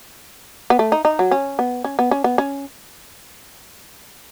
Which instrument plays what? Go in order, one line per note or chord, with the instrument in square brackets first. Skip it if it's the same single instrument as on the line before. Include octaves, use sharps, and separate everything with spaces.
[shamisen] B3
A3
D#4
D#4
F#3
C#4
B3
C#4
B3
C#4
B3
C#4